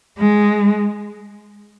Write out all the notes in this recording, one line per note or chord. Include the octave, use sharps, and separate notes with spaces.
G#3